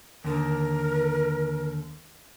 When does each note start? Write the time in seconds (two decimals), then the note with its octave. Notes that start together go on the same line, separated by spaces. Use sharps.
0.24 D#2 D3 A#4